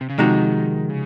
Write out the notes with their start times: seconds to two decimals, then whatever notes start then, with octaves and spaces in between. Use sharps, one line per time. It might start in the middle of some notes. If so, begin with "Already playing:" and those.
0.01 C3
0.09 C#3
0.18 C3 D#3 F3 G#3 D#4 F#4
0.90 C#3